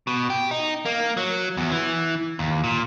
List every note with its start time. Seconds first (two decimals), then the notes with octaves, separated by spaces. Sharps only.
0.07 B2
0.30 G4
0.51 D#4
0.85 A#3
1.17 F#3
1.57 E2
1.72 E3
2.39 D#2
2.64 A#2